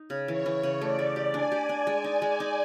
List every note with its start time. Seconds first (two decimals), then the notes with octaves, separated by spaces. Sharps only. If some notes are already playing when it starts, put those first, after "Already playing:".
Already playing: D#4
0.10 C#3
0.28 E3 C#5
0.46 E3
0.63 C#3
0.81 A3 D5
0.99 A3
1.16 G4
1.33 D4 G#5
1.52 G4
1.69 D4
1.87 G#3
2.04 D#4
2.22 G#3
2.40 D#4